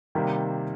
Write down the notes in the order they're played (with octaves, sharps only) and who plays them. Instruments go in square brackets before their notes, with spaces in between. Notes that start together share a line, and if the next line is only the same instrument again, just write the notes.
[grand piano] C3 D#3 G3 A#3